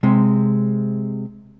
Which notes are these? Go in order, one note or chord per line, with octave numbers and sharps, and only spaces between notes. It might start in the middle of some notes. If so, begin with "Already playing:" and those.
C3 G#3